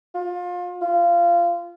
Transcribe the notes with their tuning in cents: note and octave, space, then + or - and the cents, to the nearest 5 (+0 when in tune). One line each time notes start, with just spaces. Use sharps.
F4 +30
F4 -20